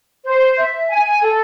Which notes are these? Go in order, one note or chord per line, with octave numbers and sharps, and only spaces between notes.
C5
E5
G#5
A4